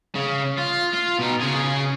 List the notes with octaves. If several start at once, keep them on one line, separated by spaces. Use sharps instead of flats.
C#3
F4
F4
B2 D#4
C#3 G#4